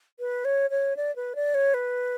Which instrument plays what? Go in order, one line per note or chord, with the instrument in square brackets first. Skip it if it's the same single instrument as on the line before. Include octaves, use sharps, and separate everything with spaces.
[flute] B4
C#5
C#5
D5
B4
D5
C#5
B4